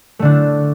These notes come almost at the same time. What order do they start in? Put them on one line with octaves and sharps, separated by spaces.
A3 D3 D4